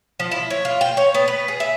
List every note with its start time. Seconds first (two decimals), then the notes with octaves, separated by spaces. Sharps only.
0.20 F3
0.31 E4
0.50 C#5
0.65 F4
0.81 G5
0.97 C#5
1.14 B3
1.28 B4
1.48 G#4
1.60 E5